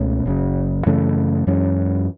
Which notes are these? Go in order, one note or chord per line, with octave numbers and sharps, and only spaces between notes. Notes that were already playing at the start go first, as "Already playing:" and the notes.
Already playing: C#2 B2 A3 C#4
F#1 F#2 C#3
F#2 C#3 E3 A3
F#2 E3 G#3 C#4